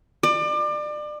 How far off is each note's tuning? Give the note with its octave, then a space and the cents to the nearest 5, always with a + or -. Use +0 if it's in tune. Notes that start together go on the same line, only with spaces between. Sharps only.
D5 +30